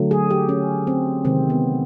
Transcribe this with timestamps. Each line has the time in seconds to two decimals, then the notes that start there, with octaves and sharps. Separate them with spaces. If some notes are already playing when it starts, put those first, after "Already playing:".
Already playing: D3 F#3 A3
0.11 G#4
0.30 G4
0.49 C#4
0.87 C4
1.25 C3 D#3 G#3 C4
1.50 B3